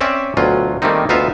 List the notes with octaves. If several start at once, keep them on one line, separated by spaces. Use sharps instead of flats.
C4 C#4 D5 E5
D2 B2 F#3 F4
D#3 G3 A3 A#3 C4 D#4
D2 B3 D#4 F4 E5 F5